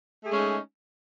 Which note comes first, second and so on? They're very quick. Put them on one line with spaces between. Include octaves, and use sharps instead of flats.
A3 G#4 G#3 C#4 D#4